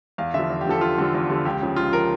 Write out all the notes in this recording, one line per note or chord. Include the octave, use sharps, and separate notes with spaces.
E2 F5
D3 E5
F3
E2
G4
D3 F3 A4
E2 F4
D3 F3
E2
D3 F3
C#2 G4
C#3 F3
C#2 F4
C#3 F3 A#4